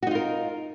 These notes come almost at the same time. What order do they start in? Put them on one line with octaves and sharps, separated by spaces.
F#4 D#4 F4 A#4